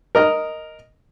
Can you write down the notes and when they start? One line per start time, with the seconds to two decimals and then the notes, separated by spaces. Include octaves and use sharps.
0.15 A#4 D#5 F6